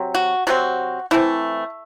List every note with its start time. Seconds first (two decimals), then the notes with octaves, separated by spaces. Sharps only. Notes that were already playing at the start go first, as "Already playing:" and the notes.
Already playing: C3 F#3 C4
0.15 F#4
0.47 C3 F#3 C4 F#4
1.11 E3 A3 C4 E4